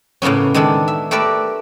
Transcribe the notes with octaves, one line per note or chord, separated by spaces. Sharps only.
A2 C#3 A#3 B3 C#4
D#3 G#3 D4 A4
E5
A3 G4 A#4 B4 D5 E5